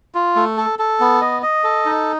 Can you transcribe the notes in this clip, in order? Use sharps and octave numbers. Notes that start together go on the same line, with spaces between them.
F4
A3
A4
A4
B3
D#5
D#5
A4
D#4